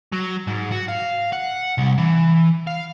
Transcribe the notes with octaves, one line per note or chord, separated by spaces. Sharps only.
F#3
G#2
F#4
F5
F#5
C2
E3
F5